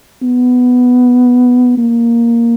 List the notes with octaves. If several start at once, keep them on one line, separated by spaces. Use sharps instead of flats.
B3
A#3